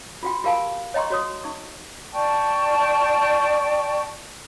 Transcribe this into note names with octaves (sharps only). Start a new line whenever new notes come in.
F4 F#4 G5
F4 G4 A#4 F5 G#5 A5
C#5 D#5 G5 A#5 C6 C#6
F#4 C#5 D#6
D#4 C#6
D5 G5 A5 C#6